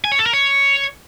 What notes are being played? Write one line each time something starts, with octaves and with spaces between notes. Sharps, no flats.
G#5
C#5
A4
A#4
C#5